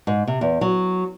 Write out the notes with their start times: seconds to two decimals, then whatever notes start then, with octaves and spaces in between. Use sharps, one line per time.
0.07 G#2
0.27 C3
0.41 E2
0.61 F#3